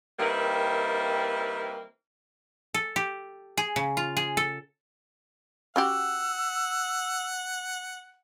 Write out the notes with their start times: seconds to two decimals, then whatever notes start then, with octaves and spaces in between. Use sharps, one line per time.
0.19 D#3 G3 A#3 C4 E4 B4
2.74 A4
2.96 G4
3.57 G#4
3.76 C#3
3.97 F4
4.17 G#4
4.37 A4
5.76 C#4 F#4 G4 F#5 E6